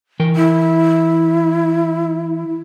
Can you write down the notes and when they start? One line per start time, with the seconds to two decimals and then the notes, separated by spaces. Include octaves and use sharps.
0.20 E3 A#4 G5
0.36 E4